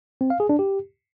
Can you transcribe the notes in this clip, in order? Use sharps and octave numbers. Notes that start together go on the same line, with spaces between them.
C4
F5
G#4
D4
G4